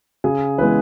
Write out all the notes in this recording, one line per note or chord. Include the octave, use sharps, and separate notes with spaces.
C#3 G#4
E3 G#3 B3 B4